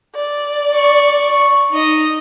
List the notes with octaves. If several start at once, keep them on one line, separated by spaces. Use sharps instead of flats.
D5
C#6
D#4 D#5